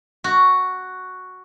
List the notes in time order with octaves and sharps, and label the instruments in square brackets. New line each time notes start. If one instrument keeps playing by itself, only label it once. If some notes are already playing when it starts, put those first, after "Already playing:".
[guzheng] F#4